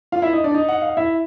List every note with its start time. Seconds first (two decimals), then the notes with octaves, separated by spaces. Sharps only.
0.12 F4 F5
0.22 E4 E5
0.33 D#4 D#5
0.44 D4 D5
0.54 D#4 D#5
0.69 F#5
0.82 F5
0.97 E4 E5